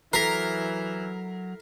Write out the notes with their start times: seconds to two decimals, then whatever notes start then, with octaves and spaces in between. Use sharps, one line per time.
0.13 E3 F#3 A4 A#4 A#5 B6 C7